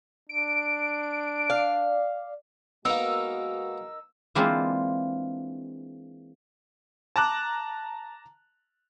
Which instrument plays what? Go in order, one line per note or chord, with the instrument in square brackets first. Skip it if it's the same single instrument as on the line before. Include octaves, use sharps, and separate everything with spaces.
[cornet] D4 [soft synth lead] D7
[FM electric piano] D5 [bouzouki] F5
[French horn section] B2 G#3 F#4 [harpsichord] A#3 B3 [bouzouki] D#4 A#4 [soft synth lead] E6
[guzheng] E3 G#3 A#3 C4 D4 F4
[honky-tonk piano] A5 A#5 D6 F#6